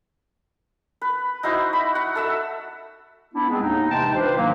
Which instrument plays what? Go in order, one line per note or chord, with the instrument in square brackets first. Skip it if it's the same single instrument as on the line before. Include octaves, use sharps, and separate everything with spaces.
[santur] B4
D#4 E4 F#4 C5
B5
F#5
A4 E5 E6
[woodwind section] B3 D4 E4
G#3 B3 C4 D4 G#4
D#2 A2 D#4
C3 E3 G#3 G5 A5
D4 F4 B4 C5
G#2 D#3 F#3 A#3